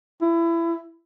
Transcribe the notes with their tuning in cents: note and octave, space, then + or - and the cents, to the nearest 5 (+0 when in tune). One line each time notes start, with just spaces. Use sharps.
E4 +25